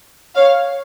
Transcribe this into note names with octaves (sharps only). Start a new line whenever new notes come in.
C#5 F5